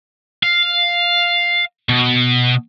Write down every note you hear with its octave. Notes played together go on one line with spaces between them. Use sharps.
F5
B2